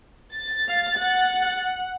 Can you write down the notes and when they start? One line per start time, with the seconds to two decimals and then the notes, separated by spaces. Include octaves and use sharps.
0.34 A6
0.69 F5
0.99 F#5